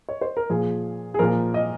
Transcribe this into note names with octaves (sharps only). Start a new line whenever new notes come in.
C#5
C5
A#4
A#2 F3 G#4
G#4
A#2 F3 A#4
D#5